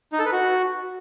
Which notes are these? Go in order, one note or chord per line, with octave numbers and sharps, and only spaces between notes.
D#4
A4
B4
F#4